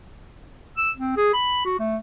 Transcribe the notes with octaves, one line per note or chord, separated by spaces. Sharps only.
E6
C4
G#4
B5
F#4
A3